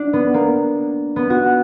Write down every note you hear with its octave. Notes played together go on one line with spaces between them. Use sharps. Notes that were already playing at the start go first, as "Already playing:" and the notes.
Already playing: D4
B3
A#3
B3
F#4